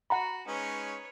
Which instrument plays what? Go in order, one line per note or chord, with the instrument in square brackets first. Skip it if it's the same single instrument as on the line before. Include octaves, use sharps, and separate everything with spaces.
[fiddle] F#4 [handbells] F#5 A#5 B5
[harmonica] G#3 C#4 D#4 [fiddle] B4 C#5